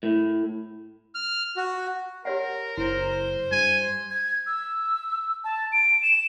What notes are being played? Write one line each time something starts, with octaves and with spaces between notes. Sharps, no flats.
A2
F6
F#4
G4 A#4 C#5 F#5
F#1 E4 C5
G2 G#5
G#6
E6
A5
D7
E7